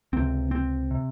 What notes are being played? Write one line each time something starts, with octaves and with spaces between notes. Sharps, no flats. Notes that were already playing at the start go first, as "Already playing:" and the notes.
C#2 C3 C4
C4
C3